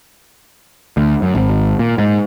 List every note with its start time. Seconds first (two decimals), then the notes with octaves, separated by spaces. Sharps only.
0.97 D2
1.22 F#2
1.35 G#1
1.79 A#2
1.98 G#2